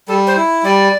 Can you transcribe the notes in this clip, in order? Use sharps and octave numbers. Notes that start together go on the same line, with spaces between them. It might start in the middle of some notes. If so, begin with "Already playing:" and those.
G3 A4
C5
E4
G3 D5